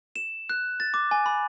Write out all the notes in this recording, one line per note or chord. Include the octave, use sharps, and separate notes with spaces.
E7
F#6
A6
D6
G#5
B5